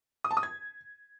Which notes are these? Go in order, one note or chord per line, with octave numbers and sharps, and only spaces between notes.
D#6
A5
D#6
G#6